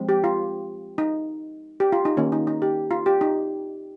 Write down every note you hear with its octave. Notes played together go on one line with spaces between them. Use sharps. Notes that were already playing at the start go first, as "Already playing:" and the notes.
Already playing: F3 G#3 C4
G4
F4
D#4
G4
F4
D#4
D#3 A#3 C#4
D#4
D#4
G4
F4
G4
D#4